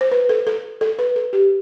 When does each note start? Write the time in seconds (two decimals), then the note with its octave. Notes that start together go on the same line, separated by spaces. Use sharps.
0.01 C5
0.11 B4
0.29 A4
0.47 A4
0.81 A4
0.99 B4
1.16 A4
1.33 G4